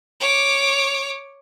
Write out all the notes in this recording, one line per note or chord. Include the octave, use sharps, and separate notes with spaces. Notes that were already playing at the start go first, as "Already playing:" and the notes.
C#5 D6